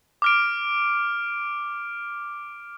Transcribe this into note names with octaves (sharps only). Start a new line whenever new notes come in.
D6 F6 D7